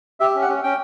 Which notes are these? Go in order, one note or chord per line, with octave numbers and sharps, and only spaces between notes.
G4 E5
C#4
F#5
C#4
C#4 G5